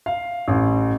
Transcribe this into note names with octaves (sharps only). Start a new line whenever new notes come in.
F5
A1